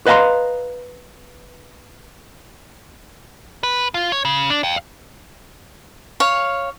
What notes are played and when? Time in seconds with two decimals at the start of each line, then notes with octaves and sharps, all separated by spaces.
0.06 B4 D#5 F5 G#5 A#5 C6
3.63 B4
3.94 F4
4.12 C#5
4.25 C#3
4.50 D4
4.64 F5 G5
6.20 C#5 F5